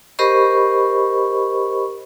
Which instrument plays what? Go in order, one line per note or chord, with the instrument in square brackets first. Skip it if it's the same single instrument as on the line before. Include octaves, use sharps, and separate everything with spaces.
[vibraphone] G4 A#4 C5 D#5 B5 C#6